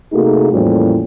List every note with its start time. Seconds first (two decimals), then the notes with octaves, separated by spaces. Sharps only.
0.13 C3 A3 A#3 D#4 F#4 G#4
0.52 E2 A2 F3 G3 A#3 C#4